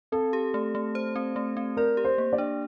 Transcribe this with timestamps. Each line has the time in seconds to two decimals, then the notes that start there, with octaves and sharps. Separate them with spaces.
0.12 C4 A4
0.33 G4
0.54 A3
0.75 A3
0.95 C5
1.16 C4
1.36 A3
1.57 C4
1.77 A#4 D5
1.97 G4
2.04 C5
2.18 A#3
2.33 D5
2.38 D4